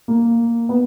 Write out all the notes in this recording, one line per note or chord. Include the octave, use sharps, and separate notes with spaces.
A#3
B3